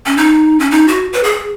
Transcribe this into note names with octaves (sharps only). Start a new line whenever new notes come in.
C#4
D#4
C#4
D#4
F#4
B4
G#4